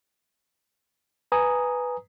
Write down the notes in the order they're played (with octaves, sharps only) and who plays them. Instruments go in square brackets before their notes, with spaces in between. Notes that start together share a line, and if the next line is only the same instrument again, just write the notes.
[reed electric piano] B4 G#5 A#5 D#6